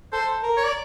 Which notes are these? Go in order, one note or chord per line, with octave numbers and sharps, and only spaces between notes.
A4 C5
A#4
C#5
D5